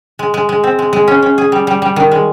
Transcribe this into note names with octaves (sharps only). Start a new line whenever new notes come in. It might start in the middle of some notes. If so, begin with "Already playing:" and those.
G#3
G#3
G#3
C4
G#3
G#3
C#4
C#4
G#4
G3
G3
G3
D#3
G#3